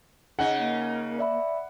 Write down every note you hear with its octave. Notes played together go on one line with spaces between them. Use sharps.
C#3 D#4 F#5
A#3
D5 E5 B5